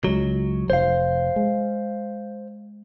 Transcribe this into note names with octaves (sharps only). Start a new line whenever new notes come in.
C#2 F#3 G#3
F1 C5 F5
G#3